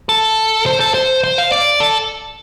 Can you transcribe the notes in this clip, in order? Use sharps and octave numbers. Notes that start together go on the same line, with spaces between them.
A4
C5
A4
C5
C5
F5
D5
A4